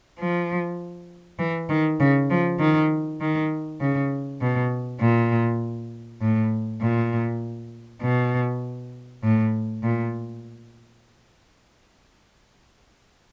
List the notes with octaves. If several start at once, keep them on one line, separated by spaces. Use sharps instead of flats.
F3
E3
D#3
C#3
F3
D#3
D#3
C#3
B2
A#2
A2
A#2
B2
A2
A#2